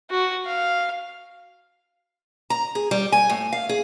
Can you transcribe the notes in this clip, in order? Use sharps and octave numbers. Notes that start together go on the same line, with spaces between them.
F#4
F5
A#5
G#4
G3
G#5
A2
F5
G#4